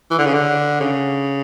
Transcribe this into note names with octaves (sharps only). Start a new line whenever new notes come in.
E3
D3
C#3
D3
C#3